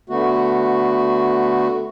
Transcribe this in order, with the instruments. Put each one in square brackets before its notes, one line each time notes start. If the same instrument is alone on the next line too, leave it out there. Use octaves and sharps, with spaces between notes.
[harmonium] D3 A3 B3 F#4